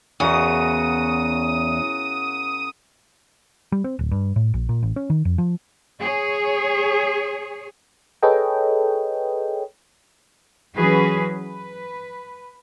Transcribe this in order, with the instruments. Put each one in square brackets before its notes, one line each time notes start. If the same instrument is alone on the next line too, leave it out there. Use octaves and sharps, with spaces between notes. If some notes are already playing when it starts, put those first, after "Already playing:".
[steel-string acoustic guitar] E2 [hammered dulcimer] C#3 F#4 A#4 [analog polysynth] D#6
[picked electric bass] G3
C4
D1
G2
A2
A#1
A#2
A1
C#4
D#3
F2
F3
[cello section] G#4 C#5
[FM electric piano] G#4 A4 B4 C#5 D#5 G5
[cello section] E3 F#3 C#4 F#4 G#4 B4
B4